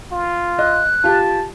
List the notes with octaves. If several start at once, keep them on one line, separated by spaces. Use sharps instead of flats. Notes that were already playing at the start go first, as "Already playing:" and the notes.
F4
D#5 F#6
F4 G4 A5